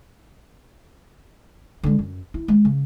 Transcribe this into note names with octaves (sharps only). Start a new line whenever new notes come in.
D3 G#3
F#2
E4
G#3
C#3